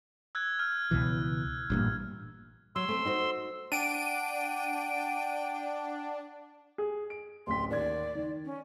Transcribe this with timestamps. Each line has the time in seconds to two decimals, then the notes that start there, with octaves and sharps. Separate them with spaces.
0.35 E6 F#6 G#6
0.59 F6
0.91 C#2 B2 E3
1.70 A1 G2 A#2
2.76 F#3 C6 E6
2.89 A3 C4
3.05 D#4 F#4 C5
3.72 D4 F#5 G5 D7 D#7
6.78 G#4
7.10 D7
7.47 D1 A1 C6 B6
7.70 D#2 D5 G#6
8.15 D#3
8.45 C#4